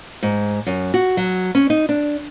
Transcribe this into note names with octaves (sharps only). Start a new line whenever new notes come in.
G#2
F#2
F#4
F#3
C#4
D#4
D4